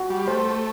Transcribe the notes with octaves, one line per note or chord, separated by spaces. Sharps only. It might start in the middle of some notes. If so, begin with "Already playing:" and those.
Already playing: F#4
G3
A3 C5